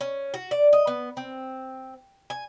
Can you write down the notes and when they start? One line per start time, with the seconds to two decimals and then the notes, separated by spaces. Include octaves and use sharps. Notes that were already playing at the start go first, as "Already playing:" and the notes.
0.01 C#4
0.34 F#4
0.51 D5
0.73 D#5
0.87 B3
1.17 C4
2.30 G#5